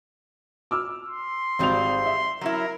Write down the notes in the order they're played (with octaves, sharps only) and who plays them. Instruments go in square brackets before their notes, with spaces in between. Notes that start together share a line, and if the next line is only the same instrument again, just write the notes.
[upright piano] D6 E6 F6
[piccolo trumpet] C6
[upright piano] G#1 F7 [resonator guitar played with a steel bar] G3 G#3 C4
[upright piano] E5
[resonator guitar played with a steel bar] F#3 C#4 E4 [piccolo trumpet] A#4